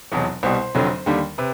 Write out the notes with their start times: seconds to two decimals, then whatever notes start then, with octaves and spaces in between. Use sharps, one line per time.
0.12 F1 E2 B2 F#3
0.43 C2 B2 G3 C5
0.75 F1 F2 D3 F#3
1.06 D#2 D3 G3
1.38 C3 B4